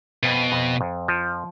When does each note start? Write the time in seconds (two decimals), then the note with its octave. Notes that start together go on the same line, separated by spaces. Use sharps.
0.23 F2 B2
0.52 F2
0.81 F2
1.08 F3